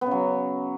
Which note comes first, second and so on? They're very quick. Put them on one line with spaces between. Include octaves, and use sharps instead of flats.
B3 C#3 F#3